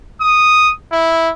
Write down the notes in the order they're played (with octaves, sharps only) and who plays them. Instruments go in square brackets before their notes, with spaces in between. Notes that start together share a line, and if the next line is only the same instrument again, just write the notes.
[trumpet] D#6
E4